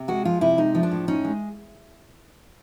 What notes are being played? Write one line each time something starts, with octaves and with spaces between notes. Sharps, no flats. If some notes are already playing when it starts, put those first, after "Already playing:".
Already playing: C3
G#3 F#4
F3 F4
C3 E4
G#3 D#4
F3
D4
A2
C#4 D#4
G#3